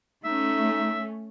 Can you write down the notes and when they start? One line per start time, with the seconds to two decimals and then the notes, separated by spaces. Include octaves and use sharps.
0.24 A3 C#4 D#4 E5